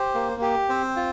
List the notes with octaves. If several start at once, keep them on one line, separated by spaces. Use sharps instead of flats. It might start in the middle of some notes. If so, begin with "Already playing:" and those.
Already playing: G4 C5
A#3
G4
C4 C5
F4